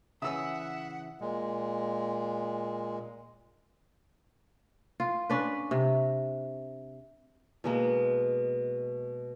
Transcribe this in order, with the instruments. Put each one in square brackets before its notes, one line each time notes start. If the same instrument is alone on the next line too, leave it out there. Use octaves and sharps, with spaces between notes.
[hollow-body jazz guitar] C#3 E3 C#4 [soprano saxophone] E5 [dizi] F#5 [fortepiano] D#6 E6
[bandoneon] A#2 G#3
[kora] F4
C#4 D4 B4
C3
[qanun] B2 G#3 A#3